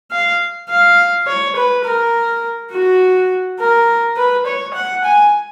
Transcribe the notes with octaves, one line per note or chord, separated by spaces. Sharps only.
F5
F5
C#5
B4
A#4
F#4
A#4
B4
C#5
F#5
G#5